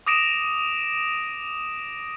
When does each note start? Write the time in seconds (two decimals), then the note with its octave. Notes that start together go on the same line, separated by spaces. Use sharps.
0.06 D6 D#6 A#6 D7 E7